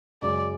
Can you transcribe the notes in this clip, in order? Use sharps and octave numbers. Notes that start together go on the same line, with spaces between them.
F#2 C#3 G#3 C#4 D5